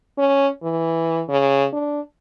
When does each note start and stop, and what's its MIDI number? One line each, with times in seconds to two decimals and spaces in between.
0.18 0.49 61
0.63 1.23 52
1.29 1.66 49
1.73 2.00 62